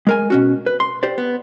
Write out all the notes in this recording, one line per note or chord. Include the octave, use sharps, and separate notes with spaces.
G#3 A#4 G#5
B2 C#4 F#4
B4
C6
G4 C5 D5
B3